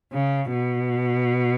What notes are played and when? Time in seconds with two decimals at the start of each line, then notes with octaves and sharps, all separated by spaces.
0.12 C#3
0.51 B2